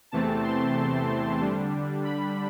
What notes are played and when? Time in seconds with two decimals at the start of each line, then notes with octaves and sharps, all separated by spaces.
0.11 E2 C3 E3 A3 C4 A5
0.44 C6
1.40 D3 G3 D4
2.05 B5